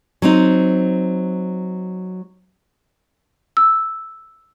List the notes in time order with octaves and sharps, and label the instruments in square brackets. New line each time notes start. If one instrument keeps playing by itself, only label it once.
[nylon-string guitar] F#3 C4 D#4
[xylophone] E6